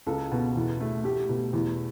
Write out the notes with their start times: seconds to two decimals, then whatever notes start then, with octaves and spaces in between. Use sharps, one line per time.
0.06 C#2 A4
0.32 B2
0.56 E2
0.80 A3
1.04 A3 G4
1.29 B2
1.53 E2